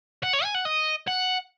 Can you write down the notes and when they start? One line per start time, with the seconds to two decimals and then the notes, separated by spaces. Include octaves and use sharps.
0.23 F#5
0.33 C#5
0.44 G#5
0.54 F#5
0.65 D#5
1.07 F#5